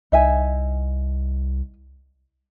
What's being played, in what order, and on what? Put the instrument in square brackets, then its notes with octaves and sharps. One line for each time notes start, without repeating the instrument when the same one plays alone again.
[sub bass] C2 [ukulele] D#4 E5 G#5